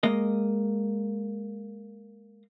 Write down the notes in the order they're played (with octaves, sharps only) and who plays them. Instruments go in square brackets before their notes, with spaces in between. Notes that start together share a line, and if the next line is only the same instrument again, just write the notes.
[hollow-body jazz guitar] G#3 A#3 D#5